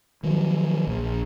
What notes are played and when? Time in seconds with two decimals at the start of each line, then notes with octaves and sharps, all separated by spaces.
0.23 D#3 F3 F#3
0.87 A#1